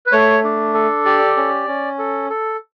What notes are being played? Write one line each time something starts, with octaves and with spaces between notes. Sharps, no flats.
B4
A3 C#5
D4
A4
G4 D5
C#4
C#4
A4
A4